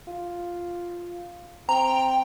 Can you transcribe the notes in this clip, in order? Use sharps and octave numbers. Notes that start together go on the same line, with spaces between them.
F4
C4 G5 A#5